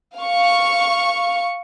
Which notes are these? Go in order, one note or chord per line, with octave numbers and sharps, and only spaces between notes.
F5 C#6